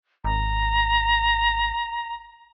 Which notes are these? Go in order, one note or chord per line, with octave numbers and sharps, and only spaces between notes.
G#1 A#5